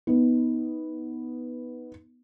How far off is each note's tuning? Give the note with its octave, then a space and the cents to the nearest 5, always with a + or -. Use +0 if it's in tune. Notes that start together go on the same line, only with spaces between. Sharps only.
B3 +0 D#4 +20